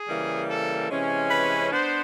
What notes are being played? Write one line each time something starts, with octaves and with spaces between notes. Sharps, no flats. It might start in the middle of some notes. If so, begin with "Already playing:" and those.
Already playing: G#4
C#3 E3 G3 A#3
A4
C3 E3 G#3 C#4
B4
B3 D4 C5